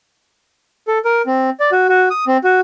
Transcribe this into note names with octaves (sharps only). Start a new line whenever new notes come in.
A4
A#4
C4
D5
F#4
F#4
D#6
C4
F#4